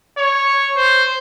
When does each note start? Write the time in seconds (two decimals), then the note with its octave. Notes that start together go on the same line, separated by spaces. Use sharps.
0.18 C#5
0.77 C5